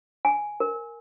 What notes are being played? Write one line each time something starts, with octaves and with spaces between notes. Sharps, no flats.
G#5
A#4